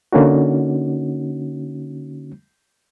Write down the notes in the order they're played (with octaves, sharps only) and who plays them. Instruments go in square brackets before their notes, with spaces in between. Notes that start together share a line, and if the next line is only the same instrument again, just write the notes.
[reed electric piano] D3 A#3 C#4 D#4 F#4